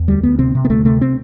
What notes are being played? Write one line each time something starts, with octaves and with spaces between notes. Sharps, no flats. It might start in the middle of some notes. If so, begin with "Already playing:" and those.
Already playing: E2
D2 G3
D2 B3
C3 C4
C3
B3
D2 A3
C3 A3
C4